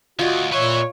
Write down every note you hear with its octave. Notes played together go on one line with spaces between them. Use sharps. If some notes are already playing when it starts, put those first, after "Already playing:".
D2 F4 F#4 D#5
A#2 B4 C#5 E5